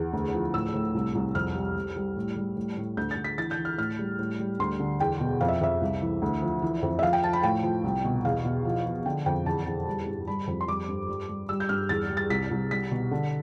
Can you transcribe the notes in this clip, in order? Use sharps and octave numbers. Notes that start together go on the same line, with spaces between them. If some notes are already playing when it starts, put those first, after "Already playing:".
Already playing: E2
D2
F3
A2 E6
A2
C2
C2
F2 F6
G3
G3
G3
A2
G3
A2
A2
D2 G6
A6
D2
B6
E3 A6
G6
E3
F6
A2 F6
G3
A2
G3
D2 C6
D3
E2 G5
B2
F2 F5
E5
F2 E5
C2
E3
D2
F3
E3
F2
E5
F3 F5
G5
F3 A5
B5
A2 G5
F3
C2
B2
E2 F5
B2
F3
F3
D3 G5
F2 G5
E2 A5
E2
G3
G2
G3 B5
F2
C6
G3 D6
G2
G3
G3
G3 E6
G6
G2 F6
E2 A6
G3
A6
C2 B6
C2
G3 B6
B2
D3